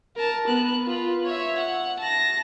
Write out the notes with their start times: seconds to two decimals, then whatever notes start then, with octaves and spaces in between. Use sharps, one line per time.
0.16 A#4 A5
0.47 B3 F#6
0.86 F4 B4
1.25 C#5 E5
1.58 F#5
2.00 A5 A#6